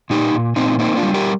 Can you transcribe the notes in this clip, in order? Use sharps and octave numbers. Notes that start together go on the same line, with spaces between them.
A#2 D#4 G4
A#2
A#2 C4 D#4
A#3 C4 D#4
D4 F4
G3
G4 A#4